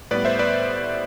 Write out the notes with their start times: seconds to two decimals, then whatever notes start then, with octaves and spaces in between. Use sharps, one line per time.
0.11 A2 G3 B3 B4 D5
0.25 C5 E5
0.39 B4 D5